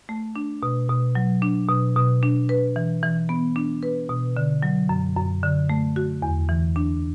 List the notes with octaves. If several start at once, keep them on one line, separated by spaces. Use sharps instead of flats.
A3
D4
B2
B2
F#3
D4
B2
B2
D4
B4
E3
E3
B3
D4
B4
B2
D3
F#3
F#2
F#2
D3
A3
F#4
E2
E3
D4